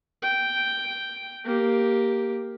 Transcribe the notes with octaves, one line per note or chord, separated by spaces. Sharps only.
G5
A#3 G4